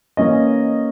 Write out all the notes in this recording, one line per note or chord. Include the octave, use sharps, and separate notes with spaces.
E3 A#3 C#4 D#5